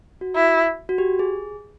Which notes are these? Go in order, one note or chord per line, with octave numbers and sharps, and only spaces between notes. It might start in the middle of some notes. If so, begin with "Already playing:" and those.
F#4
E4
F#4
G4
G#4